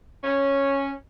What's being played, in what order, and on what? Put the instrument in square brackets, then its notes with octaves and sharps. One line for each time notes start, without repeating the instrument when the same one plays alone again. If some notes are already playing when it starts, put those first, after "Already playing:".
[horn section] C#4